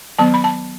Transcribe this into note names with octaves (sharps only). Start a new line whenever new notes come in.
D#3 F#3 B3 A5
B5
A5